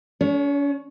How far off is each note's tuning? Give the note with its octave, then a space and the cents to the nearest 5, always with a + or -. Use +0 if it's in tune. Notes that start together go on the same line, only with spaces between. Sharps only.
C#4 +45 C#5 +0